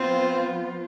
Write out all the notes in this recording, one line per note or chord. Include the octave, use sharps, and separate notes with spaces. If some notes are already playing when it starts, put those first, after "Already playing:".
Already playing: F3 B3 C4 F4 C5